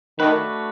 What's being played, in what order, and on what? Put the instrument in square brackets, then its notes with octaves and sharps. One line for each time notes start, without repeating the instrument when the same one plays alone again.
[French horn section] D#3 [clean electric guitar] A3 D4 F#4 B4